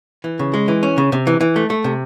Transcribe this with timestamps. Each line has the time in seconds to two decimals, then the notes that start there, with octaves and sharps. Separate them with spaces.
0.24 E3
0.39 C#3
0.54 G#3
0.68 E3
0.83 C#4
0.98 C#3
1.12 C3
1.27 E3
1.41 E3
1.56 A3
1.70 A3
1.84 C3